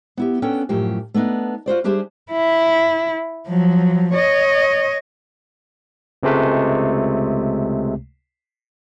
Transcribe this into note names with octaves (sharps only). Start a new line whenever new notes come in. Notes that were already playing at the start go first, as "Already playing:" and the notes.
B3 E4 G4
B3 C#4 D4 A4 G5
F#2 A2 F3 G4
A3 B3 D4 D#4
F4 F#4 C5 D5
G3 D4 G4 G#4 C5 E5
E4
F3 F#3
C#5 D#5
C#2 C3 G#3 A3